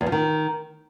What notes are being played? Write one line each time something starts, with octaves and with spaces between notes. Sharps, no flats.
E2
F3
D#3